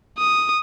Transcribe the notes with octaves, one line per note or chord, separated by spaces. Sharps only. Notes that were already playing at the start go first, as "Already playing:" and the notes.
D#6